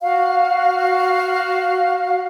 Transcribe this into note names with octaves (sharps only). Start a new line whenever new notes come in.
F#4 F5